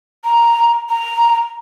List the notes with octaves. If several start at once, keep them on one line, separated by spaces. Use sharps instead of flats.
A#5
A#5